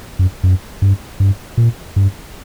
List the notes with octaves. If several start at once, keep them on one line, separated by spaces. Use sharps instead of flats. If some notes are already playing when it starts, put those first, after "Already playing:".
F#2
F#2
G2
G2
A#2
G2